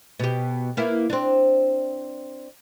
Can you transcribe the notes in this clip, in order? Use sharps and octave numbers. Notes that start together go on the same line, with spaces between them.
B2 G4
A#3 B3 E4
C4 D4